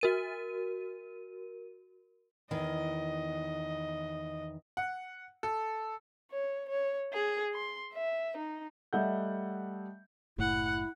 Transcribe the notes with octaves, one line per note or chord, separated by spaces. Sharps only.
F#4 A#4 D#7
E2 D#3 D#5
F#5
A4
C#5
C#5
G#4
C6
E5
D#4
G3 A3 D#5 E5 F#5 G6
F#1 A2 E4 F#5